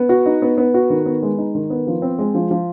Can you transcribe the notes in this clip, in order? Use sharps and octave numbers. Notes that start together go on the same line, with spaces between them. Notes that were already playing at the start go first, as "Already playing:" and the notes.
Already playing: B3
F#4
D#4
B3
B3
F#4
D#3
B3
G#3
D#4
D#3
B3
F3
C4
G#3
F3
F3